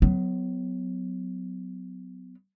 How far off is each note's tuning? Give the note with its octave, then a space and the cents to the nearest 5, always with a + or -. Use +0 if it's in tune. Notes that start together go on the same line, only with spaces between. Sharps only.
F#3 +0 B3 +35